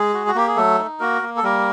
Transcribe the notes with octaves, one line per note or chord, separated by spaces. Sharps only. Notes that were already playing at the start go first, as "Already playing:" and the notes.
Already playing: G#3 G#4
F#4
F#4
A#3 G4
G#4
F#3 A3 A4
D#4
A#3 F#4 A#4
A#3
A4
G3 A#3 A#4